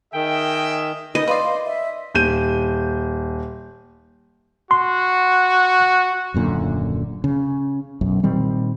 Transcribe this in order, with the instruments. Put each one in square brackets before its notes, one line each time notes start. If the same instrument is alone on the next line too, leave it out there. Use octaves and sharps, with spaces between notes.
[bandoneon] D#3 [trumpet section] G#4 D#5 E5 [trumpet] G5
[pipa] C#4 B4 [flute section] D#4 A#4 [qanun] D#5
[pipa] B4 D5 [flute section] F5 C6
[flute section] E5
[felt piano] D#1 G6 D#7
[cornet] F#4 [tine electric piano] C6
[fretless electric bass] D#1 F#2 A#2 D3
C#3
B1 F#2
A#2 D#3 G3 C4